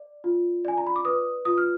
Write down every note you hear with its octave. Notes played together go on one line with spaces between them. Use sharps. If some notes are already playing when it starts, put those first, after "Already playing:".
Already playing: D5
F4
D5 G#5
A#5
B5
D6
B4 D#6
F4 D#6
F6